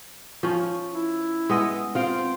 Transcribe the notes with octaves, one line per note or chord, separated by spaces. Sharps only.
F3 C#4
E4
G#3 B3 D#5
C4 F4 F5